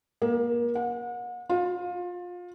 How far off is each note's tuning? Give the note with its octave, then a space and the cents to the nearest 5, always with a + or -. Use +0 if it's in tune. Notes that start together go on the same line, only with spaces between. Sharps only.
A#3 +30
F#5 -40
F4 +25